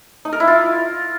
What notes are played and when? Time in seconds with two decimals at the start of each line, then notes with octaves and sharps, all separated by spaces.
0.25 D#4
0.33 A#4
0.40 E4
0.48 F4